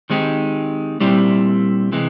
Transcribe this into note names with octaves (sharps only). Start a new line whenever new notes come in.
D#3 G#3 C4 D#4 G4
A#2 G3 C4 E4 G4
C3 E3 G#3